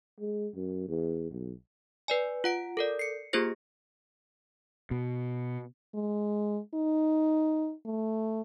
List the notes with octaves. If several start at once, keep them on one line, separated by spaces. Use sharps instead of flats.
G#3
F#2
E2
B1
B4 D5 G#5
F4 F#5 D7
A4 A#4 D5
C7 C#7
A#3 F4 G4 G#4 C5 A#6
B2
G#3
D#4
A3